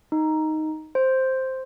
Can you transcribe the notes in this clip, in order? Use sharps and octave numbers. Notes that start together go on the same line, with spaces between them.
D#4
C5